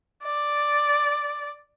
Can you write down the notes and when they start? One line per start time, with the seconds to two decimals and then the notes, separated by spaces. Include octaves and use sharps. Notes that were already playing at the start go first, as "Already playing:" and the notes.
0.24 D5